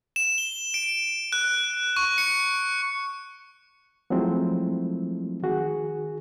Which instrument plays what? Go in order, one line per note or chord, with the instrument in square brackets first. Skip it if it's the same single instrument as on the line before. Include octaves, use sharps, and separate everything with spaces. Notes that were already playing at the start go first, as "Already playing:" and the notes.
[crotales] E7
G7
D7
F#6
C#6
C#7
[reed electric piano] F3 F#3 G#3 A3 C4 E4
D#3 F#4 G#4